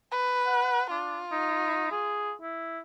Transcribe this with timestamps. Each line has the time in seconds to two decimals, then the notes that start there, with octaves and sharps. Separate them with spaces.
0.11 B4
0.46 F#5
0.91 D4 F4
1.32 D#4
1.91 G#4
2.42 E4